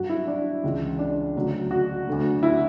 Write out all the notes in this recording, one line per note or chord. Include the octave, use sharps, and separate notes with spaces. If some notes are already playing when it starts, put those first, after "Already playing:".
Already playing: G2 F#3 F#4
E4
D4
C#2 C#3 E3
D4
D2 C#3 F#3
F#4
D2 D3 F#3
E4